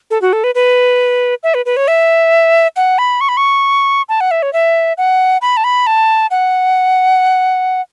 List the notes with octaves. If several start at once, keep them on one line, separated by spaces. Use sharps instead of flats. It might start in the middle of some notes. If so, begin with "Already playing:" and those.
A4
F#4
A4
B4
B4
E5
B4
B4
C#5
E5
F#5
B5
C#6
B5
C#6
A5
F#5
E5
C#5
E5
F#5
B5
A5
B5
A5
F#5